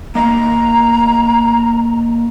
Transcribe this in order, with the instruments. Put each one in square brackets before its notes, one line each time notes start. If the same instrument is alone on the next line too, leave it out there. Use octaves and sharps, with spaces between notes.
[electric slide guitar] A#3 D#5 F5 [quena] A#5